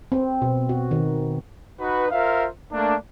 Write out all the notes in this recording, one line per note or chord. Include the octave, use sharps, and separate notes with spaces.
C4
B2
F#4
D#3
D#4 F#4 B4
F4 A#4 C5 E5 F5
A3 A#3 D4